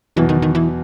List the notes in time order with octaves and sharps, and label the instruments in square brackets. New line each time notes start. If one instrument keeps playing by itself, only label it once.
[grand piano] E2 B2 F#3 [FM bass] E3
[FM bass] D#3
D#3
E3